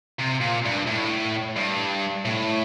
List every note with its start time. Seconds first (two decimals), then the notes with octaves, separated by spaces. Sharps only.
0.20 C3
0.41 A#2
0.65 G2
0.87 A2
1.57 G2
2.25 A2